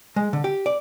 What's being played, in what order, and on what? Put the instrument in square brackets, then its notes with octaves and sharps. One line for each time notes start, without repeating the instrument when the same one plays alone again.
[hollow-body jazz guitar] G#3
D3
G4
D5